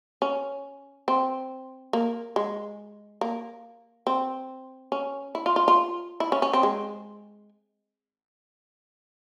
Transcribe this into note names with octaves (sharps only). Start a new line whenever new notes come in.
C#4
C4
A#3
G#3
A#3
C4
C#4
E4
F4
F4
F4
E4
C#4
C#4
C4
G#3